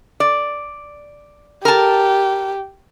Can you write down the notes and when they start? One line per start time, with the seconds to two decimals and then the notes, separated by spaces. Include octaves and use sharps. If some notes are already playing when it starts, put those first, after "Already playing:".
0.20 D5
1.65 G4 A#4 A5